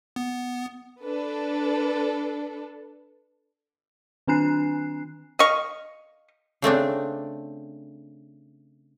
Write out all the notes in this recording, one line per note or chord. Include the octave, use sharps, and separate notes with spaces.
B3
D4 A4 B4
D#3 C4 D4 G#5 F#6 C7
D#5 F5 C#6
C#3 A3 C4 D4